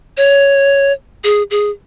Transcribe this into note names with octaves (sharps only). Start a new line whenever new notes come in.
C#5
G#4
G#4